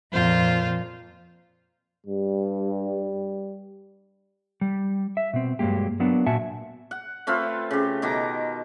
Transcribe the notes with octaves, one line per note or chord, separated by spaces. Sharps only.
F2 A#2 F4 C5
G2 G3
G3
E5
B2 C4
G2 F#3 G#3 A#3 G4
F#3 A#3 B3 D4
A#2 F#4 E5 G#5 A5
F#5
A3 C4 F4 B4
C#3 G4
B2 D#3 A#5 D6